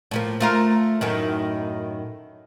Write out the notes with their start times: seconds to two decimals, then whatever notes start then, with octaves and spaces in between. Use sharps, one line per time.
0.11 A2 F3 A#3
0.40 A3 F4 A#4
1.01 F#2 A2 D#3